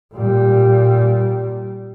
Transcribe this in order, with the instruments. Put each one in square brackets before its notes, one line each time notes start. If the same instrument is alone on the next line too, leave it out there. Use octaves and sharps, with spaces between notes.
[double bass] A#2 G3